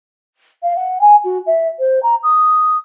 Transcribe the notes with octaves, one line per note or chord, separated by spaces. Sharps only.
F5
F#5
G#5
F#4
E5
C5
A#5
D#6